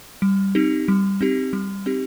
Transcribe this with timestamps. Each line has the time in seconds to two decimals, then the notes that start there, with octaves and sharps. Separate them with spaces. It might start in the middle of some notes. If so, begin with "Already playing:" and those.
0.22 G3
0.55 C4 D#4 G4
0.88 G3
1.21 C4 D#4 G4
1.53 G3
1.86 C4 D#4 G4